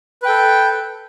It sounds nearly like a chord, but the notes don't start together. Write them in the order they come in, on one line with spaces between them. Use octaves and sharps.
B4 G5 A4